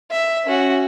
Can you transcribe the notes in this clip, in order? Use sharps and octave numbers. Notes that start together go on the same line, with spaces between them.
E5
C#4 F#4